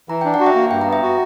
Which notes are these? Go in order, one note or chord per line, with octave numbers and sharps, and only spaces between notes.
E3 A#5
D4 G5
F#5
F#4
E5 G5
A#3
G2 G5
A#5
B3
E5 G5
F#4